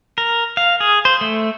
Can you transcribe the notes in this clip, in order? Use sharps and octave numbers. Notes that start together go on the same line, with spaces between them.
A#4
F5
G#4
C5
A3